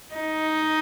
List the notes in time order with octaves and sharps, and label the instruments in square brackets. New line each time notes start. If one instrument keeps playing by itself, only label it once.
[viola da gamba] D#4